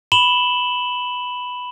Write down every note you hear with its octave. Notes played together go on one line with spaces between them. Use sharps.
B5 E7 F#7 G7